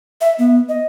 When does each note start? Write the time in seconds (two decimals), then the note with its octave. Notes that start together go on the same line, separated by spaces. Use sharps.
0.21 E5
0.39 B3
0.69 D#5